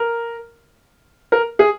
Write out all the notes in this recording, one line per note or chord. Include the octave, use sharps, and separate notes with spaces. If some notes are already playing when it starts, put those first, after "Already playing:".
Already playing: A#4
A#4
G#4